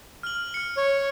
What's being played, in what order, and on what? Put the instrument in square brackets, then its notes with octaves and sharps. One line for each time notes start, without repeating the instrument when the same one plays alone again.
[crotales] F6 F#7
F6 C#7
[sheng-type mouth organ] C#5